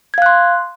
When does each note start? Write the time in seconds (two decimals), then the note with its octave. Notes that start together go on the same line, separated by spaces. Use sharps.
0.14 G#6
0.18 F5
0.22 F#6
0.26 C6